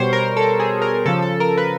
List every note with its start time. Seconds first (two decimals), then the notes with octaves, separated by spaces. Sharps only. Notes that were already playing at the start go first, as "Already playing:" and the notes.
Already playing: B2 G3 C5 C#5
0.13 A#4
0.37 A4
0.60 G#4
0.82 A#4
1.06 C#3 F3 A4
1.22 A4
1.40 A#4
1.58 B4